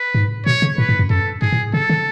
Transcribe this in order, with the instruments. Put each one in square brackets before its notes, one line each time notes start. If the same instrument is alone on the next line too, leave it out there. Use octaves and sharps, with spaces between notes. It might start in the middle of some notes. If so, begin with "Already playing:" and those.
Already playing: [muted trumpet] B4
[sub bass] G#2
[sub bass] B2 [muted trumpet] C#5
[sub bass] C#3
[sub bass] A2 [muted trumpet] B4
[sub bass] G#2
F#2
[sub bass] F#2 [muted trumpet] A4
[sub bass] G#2 [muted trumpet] G#4
[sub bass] A2
[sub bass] C#3 [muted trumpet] A4
[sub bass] D3